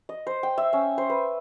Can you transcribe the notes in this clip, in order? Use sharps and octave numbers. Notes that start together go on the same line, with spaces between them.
D#5
C5
G5
E5
C#4
C5
B4